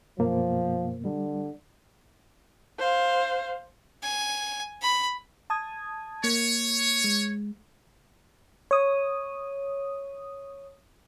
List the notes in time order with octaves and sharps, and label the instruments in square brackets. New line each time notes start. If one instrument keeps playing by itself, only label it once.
[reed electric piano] F#2 B2 A#3 [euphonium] F3
[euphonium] D3 [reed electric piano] G3
[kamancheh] C5 F5
[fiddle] G#5
B5
[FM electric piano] A5 D#6 G#6
[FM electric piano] A#3 [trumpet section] C#5
[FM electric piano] G#3
C#5 D#6